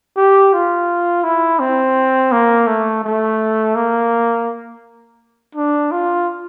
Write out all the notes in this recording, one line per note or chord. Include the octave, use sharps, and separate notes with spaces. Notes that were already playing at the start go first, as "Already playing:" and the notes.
G4
F4
E4
C4
A#3
A3
A3
A#3
D4
F4